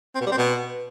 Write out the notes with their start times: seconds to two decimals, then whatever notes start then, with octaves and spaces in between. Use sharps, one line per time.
0.15 C4
0.21 B2
0.26 G3
0.32 C4
0.37 B2